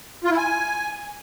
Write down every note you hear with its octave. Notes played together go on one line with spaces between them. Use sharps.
F4
E4
G#5